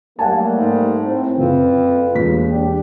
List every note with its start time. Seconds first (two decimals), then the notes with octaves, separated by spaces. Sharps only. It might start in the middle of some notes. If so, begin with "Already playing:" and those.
0.19 F#3 G3 A3 A#3 F#5 G#5 A5
0.56 G#2
1.03 A2 C4
1.38 F#1 F2 F4 B4
2.15 E1 D#2 B6
2.48 D4 G4